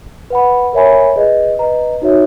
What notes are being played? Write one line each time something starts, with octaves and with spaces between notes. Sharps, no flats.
B4 F#5 B5
A#4 C#5 E5 G#5 B5
G#4 B4 D#5
B4 D#5 A#5
D#4 F#4 C#5 E5